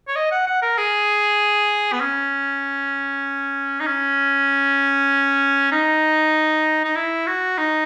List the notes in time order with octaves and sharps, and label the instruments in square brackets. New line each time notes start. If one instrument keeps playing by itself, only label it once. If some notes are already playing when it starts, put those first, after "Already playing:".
[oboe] C#5
D#5
F#5
F#5
A#4
G#4
B3
C#4
D#4
C#4
D#4
D#4
E4
F#4
D#4